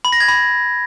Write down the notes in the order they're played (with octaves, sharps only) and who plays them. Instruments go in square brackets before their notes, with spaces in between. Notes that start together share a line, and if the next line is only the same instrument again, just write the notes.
[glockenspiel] B5
A#6
G#6
B5